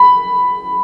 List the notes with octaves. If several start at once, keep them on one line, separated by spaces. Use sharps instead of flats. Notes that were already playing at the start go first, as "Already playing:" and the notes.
Already playing: B5